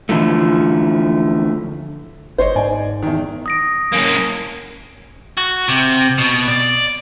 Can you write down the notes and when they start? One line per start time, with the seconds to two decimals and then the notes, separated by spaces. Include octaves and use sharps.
0.09 D3 E3 F3 A3
2.38 G1 C5 C#5 D#5
2.56 G#2 D5 G#5
3.03 E2 D#3
3.46 D#6 A#6 D7
3.93 A#3 C#4
5.37 F#4
5.68 C3
6.18 B2
6.48 D5